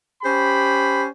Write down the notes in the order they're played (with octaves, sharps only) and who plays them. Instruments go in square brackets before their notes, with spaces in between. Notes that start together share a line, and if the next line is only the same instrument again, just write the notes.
[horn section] C#4 G4 C5 B5